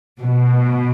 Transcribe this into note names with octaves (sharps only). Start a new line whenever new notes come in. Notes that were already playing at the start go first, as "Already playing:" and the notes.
B2